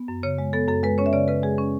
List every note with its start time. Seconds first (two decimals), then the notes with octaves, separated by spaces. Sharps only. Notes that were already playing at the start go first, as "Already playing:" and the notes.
Already playing: B3
0.08 F#2
0.23 C#3 C#5
0.38 G#3
0.53 B3 A4
0.68 F#2 A4
0.83 G#3 B4
0.98 C#4 C#5
1.06 E5
1.13 C#3 D5
1.28 C#3 B4
1.43 G#3 G#4
1.58 C#4